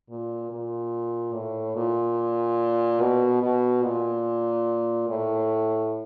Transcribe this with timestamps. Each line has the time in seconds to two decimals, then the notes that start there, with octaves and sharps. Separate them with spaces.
0.10 A#2
0.52 A#2
1.34 A2
1.76 A#2
3.01 B2
3.42 B2
3.83 A#2
5.09 A2